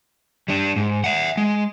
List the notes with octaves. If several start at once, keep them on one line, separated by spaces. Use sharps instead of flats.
G3 D4
G#2
E5 F#5
G#3